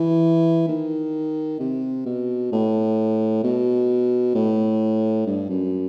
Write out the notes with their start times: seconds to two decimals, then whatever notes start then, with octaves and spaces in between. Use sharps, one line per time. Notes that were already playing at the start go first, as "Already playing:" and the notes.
Already playing: E3
0.68 D#3
1.60 C3
2.06 B2
2.52 A2
3.44 B2
4.35 A2
5.27 G2
5.50 F#2